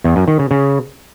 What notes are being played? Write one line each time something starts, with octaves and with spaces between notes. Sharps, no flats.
E2
F#2
D#3
C#3
C#3